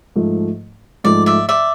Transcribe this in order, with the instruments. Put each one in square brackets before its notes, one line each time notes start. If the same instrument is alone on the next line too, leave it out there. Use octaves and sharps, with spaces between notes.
[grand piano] G#2 F3 A3
[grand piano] G#2 F3 A3 [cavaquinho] D5
[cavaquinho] D5 E5
D5 E5